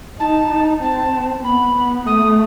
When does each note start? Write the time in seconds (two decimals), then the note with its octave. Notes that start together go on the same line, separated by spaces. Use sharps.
0.19 D#4 A5
0.50 D#4
0.82 C4 A5
1.43 B3 B5
1.74 B3
2.06 A3 D#6